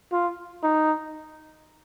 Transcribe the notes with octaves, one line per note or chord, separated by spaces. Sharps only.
F4
D#4